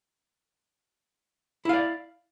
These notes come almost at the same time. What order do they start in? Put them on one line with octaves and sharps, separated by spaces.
E4 F5 D5